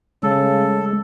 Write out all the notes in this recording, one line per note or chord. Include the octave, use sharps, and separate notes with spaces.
C#3 G#3 A4